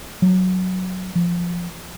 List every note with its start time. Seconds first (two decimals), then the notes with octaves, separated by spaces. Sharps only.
0.22 F#3
1.15 F3